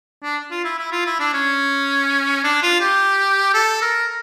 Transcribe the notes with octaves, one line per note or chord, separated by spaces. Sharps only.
D4
F4
E4
E4
F4
E4
D4
C#4
D4
F4
G4
A4
A#4